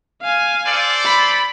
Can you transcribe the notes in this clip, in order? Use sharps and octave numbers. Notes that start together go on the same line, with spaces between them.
F5 G#5
A4 C5 D5
B5